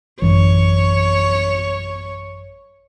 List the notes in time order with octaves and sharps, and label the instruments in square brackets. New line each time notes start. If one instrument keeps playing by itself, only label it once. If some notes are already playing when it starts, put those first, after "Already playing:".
[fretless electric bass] A1 F#2 E3 [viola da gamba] C#5